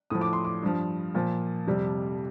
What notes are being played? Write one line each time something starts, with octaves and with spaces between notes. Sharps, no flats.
A2 F3 D#6
D6
C6
D6
G2 F3
A#2 F3
F2 C3 G3